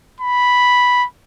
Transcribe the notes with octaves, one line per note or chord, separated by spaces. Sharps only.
B5